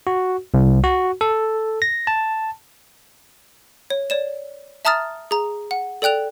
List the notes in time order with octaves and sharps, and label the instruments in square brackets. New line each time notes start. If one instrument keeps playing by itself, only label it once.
[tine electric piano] F#4
C2
F#4
A4
A#6
A5
[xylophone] C#5
C#5 D5 E7
E5 A5 A#5 D#6 F6 A6
G#4 A#5
F#5
A4 D5 G5 F#6 F7